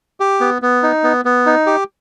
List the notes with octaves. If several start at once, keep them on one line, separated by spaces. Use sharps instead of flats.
G4
B3
B3
D#4
B3
B3
D#4
G4